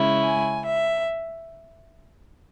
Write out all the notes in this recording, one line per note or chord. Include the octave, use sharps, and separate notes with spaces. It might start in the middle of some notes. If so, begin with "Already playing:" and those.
Already playing: C#3 G#3 C#4 E4
G#5
E5